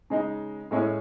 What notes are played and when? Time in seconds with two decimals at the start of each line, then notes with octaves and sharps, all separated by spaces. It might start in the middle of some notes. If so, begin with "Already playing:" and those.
0.10 C#3 G#3 D#4
0.71 A2 G#3 C#4 E4